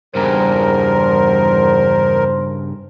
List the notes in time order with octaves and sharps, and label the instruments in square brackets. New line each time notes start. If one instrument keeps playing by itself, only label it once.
[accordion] E2 A#4 [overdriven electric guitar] G2 C#3 [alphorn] C5